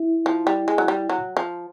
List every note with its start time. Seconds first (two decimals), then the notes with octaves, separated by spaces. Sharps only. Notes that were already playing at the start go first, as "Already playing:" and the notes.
Already playing: E4
0.26 F3
0.47 G3
0.68 G#3
0.78 F#3
0.88 G3
1.10 F#3
1.37 F3